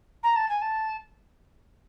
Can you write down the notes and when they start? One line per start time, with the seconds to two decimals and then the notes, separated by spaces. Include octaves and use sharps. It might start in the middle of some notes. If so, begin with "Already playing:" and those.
0.23 A#5
0.35 A5
0.48 G#5
0.61 A5